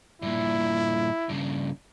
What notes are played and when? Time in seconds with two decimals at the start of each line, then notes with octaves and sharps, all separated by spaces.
0.22 G2 A#2 E4
1.29 G2 C#3